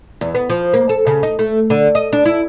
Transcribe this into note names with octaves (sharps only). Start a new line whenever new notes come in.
E2
B3
F3
A#3
A4
C#3
D#4
A3
D3
D#5
D4
E4